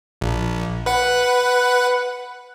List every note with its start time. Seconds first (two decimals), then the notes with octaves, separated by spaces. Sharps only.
0.21 A#1
0.86 B4 F#5